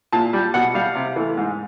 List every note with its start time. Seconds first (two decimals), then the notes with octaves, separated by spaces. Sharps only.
0.12 A#2 A5
0.33 G3
0.54 B2 F#5
0.74 G3 F5
0.95 C3
1.16 E3 A3
1.37 G#2